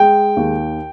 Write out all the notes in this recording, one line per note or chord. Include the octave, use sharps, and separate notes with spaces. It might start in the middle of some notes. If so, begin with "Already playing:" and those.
Already playing: G#3 G5
D#2